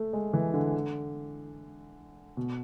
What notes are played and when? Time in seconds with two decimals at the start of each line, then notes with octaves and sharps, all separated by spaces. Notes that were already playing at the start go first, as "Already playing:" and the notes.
Already playing: A3
0.13 G#3
0.33 E3
0.54 D3
2.37 B2